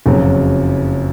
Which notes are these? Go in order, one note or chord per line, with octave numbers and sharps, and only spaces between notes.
F#1 F2 C#3 F#3